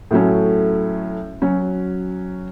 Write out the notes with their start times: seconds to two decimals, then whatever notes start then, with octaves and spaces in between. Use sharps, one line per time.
0.11 A2 F#3 A3 C#4
1.42 F#3 C#4 F#4